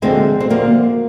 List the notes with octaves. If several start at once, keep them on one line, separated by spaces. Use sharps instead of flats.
D2 D3 F3 G#3 C4
C4
D2 D3 F3 A#3